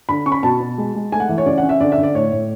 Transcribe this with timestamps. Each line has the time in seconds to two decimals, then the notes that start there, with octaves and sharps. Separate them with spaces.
0.09 D3 B5
0.26 C#4 C#6
0.32 B5
0.43 B2 A5
0.60 B2
0.78 G#3
0.95 G#3
1.12 A3 G#5
1.20 F#5
1.29 E3
1.38 C#5
1.46 C#3 D5
1.58 F#5
1.63 C#4
1.69 E5
1.80 D3 D5
1.92 E5
1.98 D3
2.03 D5
2.15 A2 C#5
2.32 A2